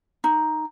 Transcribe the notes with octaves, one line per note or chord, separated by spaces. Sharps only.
D#4